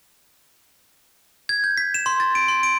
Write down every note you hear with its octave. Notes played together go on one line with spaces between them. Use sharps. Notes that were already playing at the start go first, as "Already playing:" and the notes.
G#6
G6
B6
E7
C6
A6
D7
C6
D7